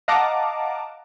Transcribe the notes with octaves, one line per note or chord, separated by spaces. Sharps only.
D#5 F5 F#5 A5 A#5 D6